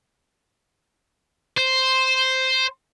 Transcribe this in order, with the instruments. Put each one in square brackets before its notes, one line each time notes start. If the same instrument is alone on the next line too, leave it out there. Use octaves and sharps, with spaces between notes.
[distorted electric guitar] C5